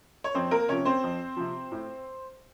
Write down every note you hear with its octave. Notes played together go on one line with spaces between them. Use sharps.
C#5
F2 C4 C5
A#3 A#4
C3 F3 C#4 C#5
C4 C5
F2
C3 F3
A2